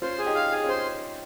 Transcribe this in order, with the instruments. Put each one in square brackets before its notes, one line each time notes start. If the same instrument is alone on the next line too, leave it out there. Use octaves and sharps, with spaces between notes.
[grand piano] C#4 F4 [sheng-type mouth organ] C5
[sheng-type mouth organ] G#4
[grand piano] D#4 G4
[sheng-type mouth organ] F5
G#4
[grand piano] C#4 F4
[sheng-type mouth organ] C5